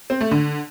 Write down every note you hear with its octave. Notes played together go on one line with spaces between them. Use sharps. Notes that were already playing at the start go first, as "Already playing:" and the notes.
C4
A3
D3